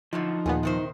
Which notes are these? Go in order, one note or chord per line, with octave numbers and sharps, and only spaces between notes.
F#2 A2 D3 F3 D#4
D#2 A#2 B3 G#4
C3 D#3 C5